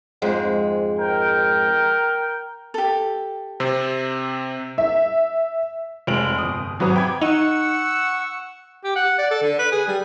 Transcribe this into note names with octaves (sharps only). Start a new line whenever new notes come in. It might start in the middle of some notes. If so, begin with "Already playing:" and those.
F2 G#2 G#3
A#4 G5
G4 A4
C3 C4
E5
F1 G#3 C5 D7 F7 F#7
G1 D#6
G#1 F#3 B4 A#5 D#6
G5 B5 D6 G#6
D#4 F#5 C#6 E6
G4
F#5
D5
A4
D3
B4
G#4
G3